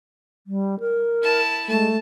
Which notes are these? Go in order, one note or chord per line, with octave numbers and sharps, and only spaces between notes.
G3
A#4
E4 A5
G#3 A3 A5